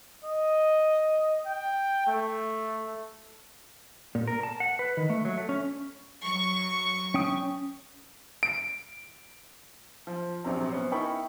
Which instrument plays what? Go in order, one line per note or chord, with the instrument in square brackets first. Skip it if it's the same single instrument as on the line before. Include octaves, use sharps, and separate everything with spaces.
[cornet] D#5
G5
A3
[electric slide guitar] A#2
A#4
A5
F#5
B4
D#3
A3
F#3
A3
C#4
[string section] F#3 C#6
[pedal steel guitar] C#4 G5 D#6
[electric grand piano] D7
[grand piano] F3
A#1 C3 F#3 C4 A#5
B3 C#4 C5
D#4 E4 A#4 G5 B5 C#6